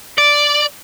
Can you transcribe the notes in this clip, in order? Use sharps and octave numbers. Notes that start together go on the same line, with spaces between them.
D5